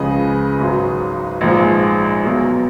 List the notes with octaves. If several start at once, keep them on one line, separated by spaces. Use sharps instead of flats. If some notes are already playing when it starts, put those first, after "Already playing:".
Already playing: C#2 C#3 F3 G#3 B4 D#5
G#1 G#2 F#3
A#1 G#2 F3 G#3
B1 B2 F#3